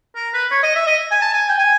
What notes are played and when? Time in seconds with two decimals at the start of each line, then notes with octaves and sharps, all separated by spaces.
0.16 A#4
0.34 B4
0.51 C#5
0.63 D#5
0.75 E5
0.87 D#5
1.11 G#5
1.22 A5
1.33 G#5
1.49 G5
1.58 G#5